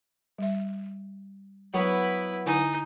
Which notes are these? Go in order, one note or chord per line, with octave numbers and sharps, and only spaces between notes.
G3 E5
F#3 B3 E4 B4 C#5
D3 D#4 E4 G#5